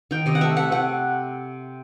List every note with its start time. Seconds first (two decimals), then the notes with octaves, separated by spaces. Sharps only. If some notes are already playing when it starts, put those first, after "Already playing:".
0.11 D#3 G5
0.26 C3 D#5
0.35 F#5
0.41 A3 E5
0.56 A3 F#5
0.72 C3 F#5